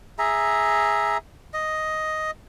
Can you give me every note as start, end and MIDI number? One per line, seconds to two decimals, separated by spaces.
0.19 1.17 68
0.19 1.17 76
0.19 1.17 82
1.54 2.31 75